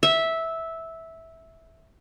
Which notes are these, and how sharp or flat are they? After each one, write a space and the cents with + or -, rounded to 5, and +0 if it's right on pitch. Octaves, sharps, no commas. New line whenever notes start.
E5 -10